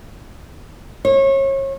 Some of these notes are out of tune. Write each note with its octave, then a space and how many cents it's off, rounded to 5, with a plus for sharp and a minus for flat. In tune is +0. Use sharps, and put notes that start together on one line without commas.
C#5 -30